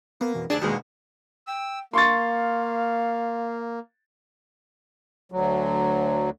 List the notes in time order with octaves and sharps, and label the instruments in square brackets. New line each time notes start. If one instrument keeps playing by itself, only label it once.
[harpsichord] A#3 [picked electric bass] B3
[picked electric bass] F2 B2 E3
[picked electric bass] F1 [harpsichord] D2 A5 [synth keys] D4 G#4 D5
[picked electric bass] D#1 [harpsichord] D2 B2 [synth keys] D#3 G#3 A#3
[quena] G5 [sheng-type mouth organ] E6
[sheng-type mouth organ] A#3 [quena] F5 [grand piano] C6 C#6 A6
[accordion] D2 F#3